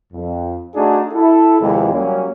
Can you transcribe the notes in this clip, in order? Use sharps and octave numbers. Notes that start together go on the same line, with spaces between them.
F2
A3 D4 D#4 F#4 G#4
E4 A4
D#2 C3 F3 G#3 B3 E4
F#3 G3 A#3 C#4